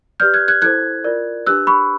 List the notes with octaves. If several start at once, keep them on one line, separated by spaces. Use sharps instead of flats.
G4 B4 D5 F6 G6
F#6 G#6
F#6 G#6
E4 A4 C5 F#6 G#6
F4 A#4 D5
D4 G4 B4 E6 F#6
B5 C#6